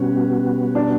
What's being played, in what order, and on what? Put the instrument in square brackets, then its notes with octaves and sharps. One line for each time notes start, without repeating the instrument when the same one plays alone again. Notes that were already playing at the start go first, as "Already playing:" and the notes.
Already playing: [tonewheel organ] B2 G3 B3 F#4 [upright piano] C#4
[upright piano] D4